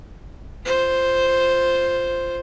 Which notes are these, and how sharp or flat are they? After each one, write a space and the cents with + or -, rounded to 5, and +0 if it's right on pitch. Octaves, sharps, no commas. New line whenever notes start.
F4 +0 C5 +0